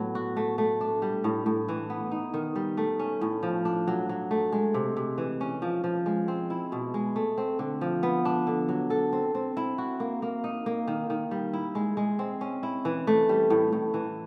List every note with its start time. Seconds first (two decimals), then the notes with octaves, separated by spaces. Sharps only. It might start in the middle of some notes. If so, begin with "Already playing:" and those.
Already playing: A2 F#3 B3
0.15 F#4
0.37 A3
0.58 A3
0.81 D4
1.02 G3
1.24 A2
1.46 A2
1.69 E3
1.90 B3
2.12 D#4
2.34 D#3
2.56 G3
2.77 A3
2.99 C#4
3.21 A2
3.43 F3
3.65 D4
3.88 F#3
4.09 F#3
4.31 A3
4.52 G#3
4.74 C3
4.97 C3
5.18 E3
5.41 C#4
5.62 F3
5.84 F3
6.06 G#3
6.28 C4
6.50 E4
6.72 B2
6.94 G#3
7.16 A3
7.38 C4
7.59 D3
7.81 F3
8.03 B3
8.25 D4
8.47 D3
8.69 F#3
8.90 A4
9.13 C4
9.35 C4
9.57 E4
9.78 F#4
10.00 A#3
10.22 A#3
10.44 D#4
10.66 A#3
10.88 D#3
11.10 D#3
11.31 G3
11.53 E4
11.75 G#3
11.97 G#3
12.19 C4
12.41 C#4
12.63 E4
12.85 E3
13.07 A3
13.29 G3
13.50 A2
13.73 A2
13.94 E3